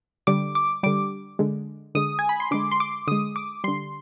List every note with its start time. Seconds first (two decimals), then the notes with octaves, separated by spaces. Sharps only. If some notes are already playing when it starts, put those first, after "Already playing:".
0.27 D3 G3 D6
0.55 D6
0.83 D3 G3 D6
1.39 D3 G#3
1.95 D3 G#3 D#6
2.19 G#5
2.29 B5
2.40 C6
2.51 D3 G#3 D6
2.72 C6
2.80 D6
3.07 D3 G#3 D#6
3.36 D6
3.64 D3 G3 C6